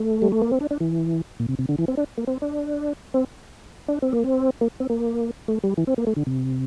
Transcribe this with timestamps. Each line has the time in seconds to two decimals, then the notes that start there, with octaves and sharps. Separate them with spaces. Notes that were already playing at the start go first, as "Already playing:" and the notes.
Already playing: A3
0.22 G3
0.32 A3
0.41 A#3
0.52 C4
0.61 D4
0.71 D4
0.80 E3
1.40 A#2
1.49 C3
1.59 C3
1.69 D3
1.78 E3
1.88 C4
1.97 D4
2.18 A#3
2.27 C4
2.42 D4
3.14 C4
3.88 D4
4.02 C4
4.13 A#3
4.24 C4
4.61 A#3
4.80 C4
4.90 A#3
5.48 A3
5.64 G3
5.77 E3
5.87 C4
5.98 A#3
6.07 A3
6.16 D3
6.27 C3